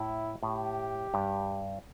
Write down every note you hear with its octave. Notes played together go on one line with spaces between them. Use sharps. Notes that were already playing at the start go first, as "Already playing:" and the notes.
Already playing: A2 E4
A2 G4
G2